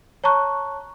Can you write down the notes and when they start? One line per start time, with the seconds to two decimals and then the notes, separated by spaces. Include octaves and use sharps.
0.24 C#5 A5 A#5 C#6 F#6